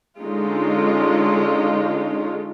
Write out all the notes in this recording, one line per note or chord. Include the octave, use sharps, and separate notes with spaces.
D3 G#3 C#4 D#4 F4